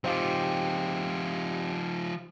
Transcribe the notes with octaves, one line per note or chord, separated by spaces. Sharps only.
F3 C4 D#4 F4 G4